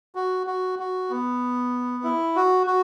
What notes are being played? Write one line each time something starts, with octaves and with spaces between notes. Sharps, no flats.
F#4
F#4
F#4
B3
E4
F#4
F#4